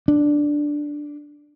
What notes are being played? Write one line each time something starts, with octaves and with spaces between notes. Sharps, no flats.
D4